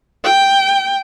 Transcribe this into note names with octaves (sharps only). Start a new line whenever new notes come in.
G5